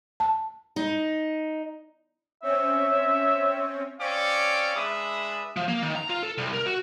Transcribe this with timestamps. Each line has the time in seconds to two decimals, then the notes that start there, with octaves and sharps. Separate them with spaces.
0.20 A5
0.76 D#4
2.42 C4 C#4 C#5 E5
4.00 C4 C#4 D5 F5 C#6 D6
4.75 G#3 D4 B4 E5 B5 D#6
5.56 F3
5.68 A#3
5.82 D#3
5.96 A#5
6.10 F4
6.23 A4
6.38 C2
6.53 A#4
6.66 F#4